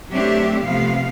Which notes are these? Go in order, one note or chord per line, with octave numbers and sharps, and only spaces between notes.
F#3 A3 C4 D4 G4 E5
C3 F3 A3 B3 F5